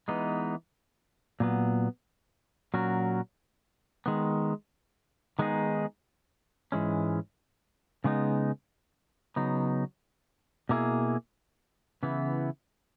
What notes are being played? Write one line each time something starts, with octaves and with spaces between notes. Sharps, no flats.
E3 G#3 B3 D#4
A#2 F#3 B3
A#2 F#3 C#4 F#4 A#4
D#3 G#3 B3
D#3 G#3 B3 D#4 G#4
G#2 E3 G#3 C#4
C#3 G#3 B3 D#4
C#3 F#3 B3 D#4
B2 A#3 E4 G#4
C#3 E3 B3 E4